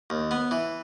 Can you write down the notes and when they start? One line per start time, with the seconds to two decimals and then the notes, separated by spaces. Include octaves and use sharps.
0.10 D#2
0.31 B3
0.51 E3